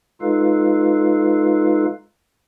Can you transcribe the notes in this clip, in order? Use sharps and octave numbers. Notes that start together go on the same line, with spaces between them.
G#3 D#4 F4 A4 B4 F5